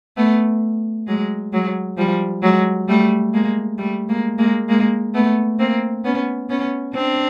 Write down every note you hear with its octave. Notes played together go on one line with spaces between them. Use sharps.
A3 B3
F#3 G#3
F#3 G#3
F3 G3
F#3 G#3
G3 A3
G#3 A#3
G3 A3
G#3 A#3
G#3 A#3
G#3 A#3
A3 B3
A#3 C4
B3 C#4
B3 C#4
C4 D4